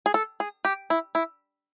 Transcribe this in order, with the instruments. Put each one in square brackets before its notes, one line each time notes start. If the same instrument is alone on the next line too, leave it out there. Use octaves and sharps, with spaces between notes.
[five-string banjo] G#4
A4
G#4
G4
E4
E4